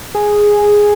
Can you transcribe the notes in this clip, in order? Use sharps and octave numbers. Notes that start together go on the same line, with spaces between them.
G#4